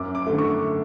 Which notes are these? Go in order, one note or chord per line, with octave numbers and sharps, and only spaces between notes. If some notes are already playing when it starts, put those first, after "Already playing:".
Already playing: F#2 D6
D6
D3 A3
C#6